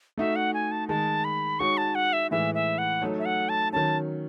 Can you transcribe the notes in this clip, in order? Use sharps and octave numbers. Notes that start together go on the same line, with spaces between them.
A3 D#4 F#4 E5
F#5
G#5
A5
D#3 G#3 D#4 A5
B5
G#3 D#4 F#4 C#5 C#6
A5
F#5
E5
A2 E3 G#3 E5
E5
F#5
F#3 A3 D#4 A4 C#5
E5
F#5
A5
D#3 F#3 C#4 A5